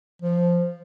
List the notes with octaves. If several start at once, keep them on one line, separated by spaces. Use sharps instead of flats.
F3